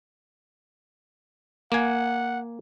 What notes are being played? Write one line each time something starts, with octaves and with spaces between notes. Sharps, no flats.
A#3 F#5 G#5